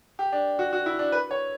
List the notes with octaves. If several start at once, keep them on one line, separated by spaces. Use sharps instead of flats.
G4
D4
F#4
F#4
E4
D4
B4
C#5